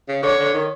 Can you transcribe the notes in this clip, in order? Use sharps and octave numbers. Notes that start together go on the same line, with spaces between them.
C#3
D3 C#5
D3
D#3